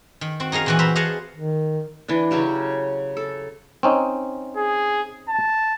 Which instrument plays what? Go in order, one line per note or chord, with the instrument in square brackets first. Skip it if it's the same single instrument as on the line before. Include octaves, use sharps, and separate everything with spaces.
[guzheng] D#3
C4 F#4
D#4 G#4 A#4 F5
A#2 E3 F#4
C5 E5 A#5 B5
G#4 D#5 F5 F#5 G#5 A5
[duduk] D#3
[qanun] E3 D4
C#3 F#3 F#4 G4
A4
[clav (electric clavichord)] C4 C#4 D#4
[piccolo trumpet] G#4
A5